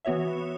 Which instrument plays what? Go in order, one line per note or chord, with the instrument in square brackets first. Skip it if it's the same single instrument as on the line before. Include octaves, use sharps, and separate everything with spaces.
[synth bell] E3 B3 F#4 C#5 E5